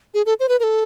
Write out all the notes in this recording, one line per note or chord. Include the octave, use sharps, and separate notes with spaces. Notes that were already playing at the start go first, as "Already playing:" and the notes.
G#4
A4
C5
B4
A#4
A4